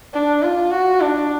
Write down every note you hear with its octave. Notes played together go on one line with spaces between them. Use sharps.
D4
F4
F#4
D4